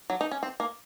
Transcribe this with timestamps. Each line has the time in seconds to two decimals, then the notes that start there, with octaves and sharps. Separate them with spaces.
0.10 F#3
0.21 D#4
0.31 C#4
0.43 C4
0.60 A#3